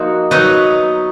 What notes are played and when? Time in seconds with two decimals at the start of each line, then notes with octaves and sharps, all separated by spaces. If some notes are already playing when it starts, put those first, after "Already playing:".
Already playing: F3 A#3 D#4 F#4
0.31 F#3 B3 D#4